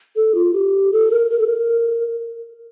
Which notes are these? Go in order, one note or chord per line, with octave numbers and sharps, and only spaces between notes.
A4
F4
G4
A4
A#4
A#4
A4
A#4